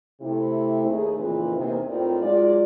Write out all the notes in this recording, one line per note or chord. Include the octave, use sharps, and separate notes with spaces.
C3 A3 E4
D#2 A3 D#4 G#4
F2 A#2 C#3 E3 C4 B4
E2 C3 A#3 C4 D#4
A2 C4 D#4 F4 A#4 D5
F#3 G#3 F4 G#4 D5